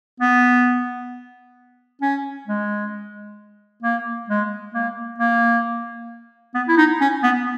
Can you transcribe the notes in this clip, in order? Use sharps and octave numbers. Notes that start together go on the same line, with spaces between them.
B3
C#4
G#3
A#3
G#3
A#3
A#3
B3
E4
D#4
C#4
B3